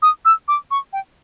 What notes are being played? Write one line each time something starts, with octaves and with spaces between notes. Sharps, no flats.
D#6
E6
D6
C#6
G5